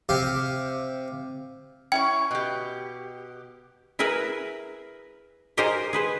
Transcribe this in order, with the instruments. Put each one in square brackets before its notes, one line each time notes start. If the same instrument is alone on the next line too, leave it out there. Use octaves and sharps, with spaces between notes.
[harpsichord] C3 G4 F5
[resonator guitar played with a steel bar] C#4 E4 C#5 [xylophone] G5
[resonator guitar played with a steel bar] B2 G4
[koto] E4 G#4 A#4 B4 E5
D#4 G4 G#4 A#4 C5 D#5
G#4 B4 C5